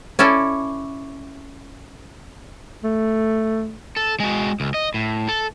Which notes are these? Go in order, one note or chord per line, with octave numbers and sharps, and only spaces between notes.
C#4 E4 A4 D5
A3
A4
G#3 F#4
C#2
D#5
A2
A4